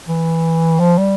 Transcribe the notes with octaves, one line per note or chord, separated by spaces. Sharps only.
E3
F3
G3